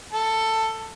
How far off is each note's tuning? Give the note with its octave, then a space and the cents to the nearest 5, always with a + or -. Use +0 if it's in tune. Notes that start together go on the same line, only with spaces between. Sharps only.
A4 +15